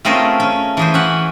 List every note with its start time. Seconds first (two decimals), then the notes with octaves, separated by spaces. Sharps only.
0.05 A3 C4 C#4 F4 G#4 A#4
0.40 C#4
0.77 E3 G#4 C5
0.94 C#4 E5 F#5